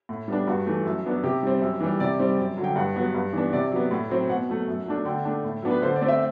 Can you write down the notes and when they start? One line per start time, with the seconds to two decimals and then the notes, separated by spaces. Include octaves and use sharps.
0.09 A2
0.28 G3 B3 D4
0.47 G2 F#4
0.66 E3 A3
0.86 F#2
1.05 F#3 B3 D4
1.23 C3 G4
1.43 G3 C4
1.62 F#2
1.81 E3 G3
2.00 C3 D5
2.19 G3 C4
2.38 F#2
2.57 D3 F#3
2.64 G5
2.76 G2 F#5
2.96 F#3 B3
3.15 G2
3.33 E3 B3 D4
3.53 C3 D5
3.71 F#3 B3
3.91 A2
4.10 F#3 C4
4.29 B2 F#5
4.49 F#3 A3
4.67 F#2
4.86 F#3 A3 D4
5.05 D3 G5
5.25 A3 D4
5.44 A2
5.62 F#3 B3 D4
5.71 B4
5.82 D3 C5
5.96 D5
6.01 A3 C4
6.08 E5